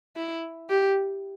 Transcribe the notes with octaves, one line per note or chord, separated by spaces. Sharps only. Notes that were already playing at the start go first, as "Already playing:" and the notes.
E4
G4